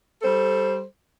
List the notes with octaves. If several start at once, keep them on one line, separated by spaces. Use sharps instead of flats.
G3 A4 C5